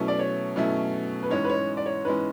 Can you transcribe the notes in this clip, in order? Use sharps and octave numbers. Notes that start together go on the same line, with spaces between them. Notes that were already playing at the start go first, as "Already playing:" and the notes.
Already playing: B2 F#3 A3 C#4 E4
D5
C#5
B2 F#3 A3 C#4 E4
B4
G#2 E3 G#3 C#4 C#5
B4
C#5
D5
C#5
G#2 E3 G#3 C#4 B4